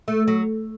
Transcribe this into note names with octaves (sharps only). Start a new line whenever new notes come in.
A3
F#3